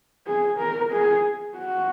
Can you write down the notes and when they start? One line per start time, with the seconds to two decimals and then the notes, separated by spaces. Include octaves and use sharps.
0.27 G#4
0.59 A#4
0.92 G#4
1.57 F#4